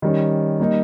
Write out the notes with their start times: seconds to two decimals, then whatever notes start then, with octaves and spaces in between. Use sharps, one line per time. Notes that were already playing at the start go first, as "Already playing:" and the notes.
0.02 D#3 G3 C#4
0.60 G3 A#3 D#4